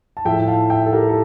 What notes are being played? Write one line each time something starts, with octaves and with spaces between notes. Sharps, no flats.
A5
A2 F3 E5 G5
F5 A5
E5 G5
A4
G4 A#4
A4